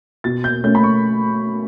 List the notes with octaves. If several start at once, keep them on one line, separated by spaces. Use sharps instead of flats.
B2 A6
G6
A3 C#4 G6
B5
C#6